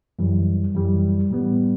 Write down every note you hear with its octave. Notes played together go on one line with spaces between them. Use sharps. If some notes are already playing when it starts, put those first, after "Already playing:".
F#2 E3 G3
F#2 E3 G3
A2 G3 B3